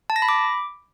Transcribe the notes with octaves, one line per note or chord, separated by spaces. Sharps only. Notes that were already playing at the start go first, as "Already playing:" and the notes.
A5
A#6
B5
D6